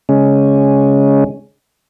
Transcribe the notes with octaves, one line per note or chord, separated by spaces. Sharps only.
C#3 G#3 C#4